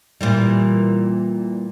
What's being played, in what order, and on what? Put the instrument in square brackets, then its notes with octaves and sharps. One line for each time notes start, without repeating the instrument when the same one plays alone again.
[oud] A#2 E3 G3